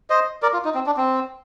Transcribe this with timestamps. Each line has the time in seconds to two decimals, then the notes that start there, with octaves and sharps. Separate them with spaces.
0.10 C5 D#5
0.42 A#4 D5
0.53 F4
0.65 D#4
0.75 C4
0.86 D4
0.97 C4